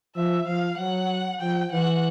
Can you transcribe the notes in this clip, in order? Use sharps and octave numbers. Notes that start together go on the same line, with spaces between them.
F3 E5
F3 F5
F#3 F#5
F3 G5
E3 F#5